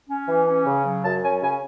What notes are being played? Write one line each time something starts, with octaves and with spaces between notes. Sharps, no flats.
C#4
E3
C#4
C#3
F#3
F#2 A5
C#4 G#5
C#3 G#5